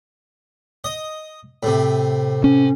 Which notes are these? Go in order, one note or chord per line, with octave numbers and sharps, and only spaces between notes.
D#5
A2 C3
C#4